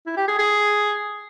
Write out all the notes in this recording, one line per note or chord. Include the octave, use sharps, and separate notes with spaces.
E4
G4
G#4
G#4